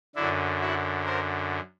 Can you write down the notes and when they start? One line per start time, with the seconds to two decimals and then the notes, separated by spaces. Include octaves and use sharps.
0.15 F#2 D3 D4 E4
0.61 E4 F#4
1.06 A#4 C5